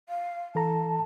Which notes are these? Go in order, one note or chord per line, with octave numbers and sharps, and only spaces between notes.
F5
E3 A4 A5 A#5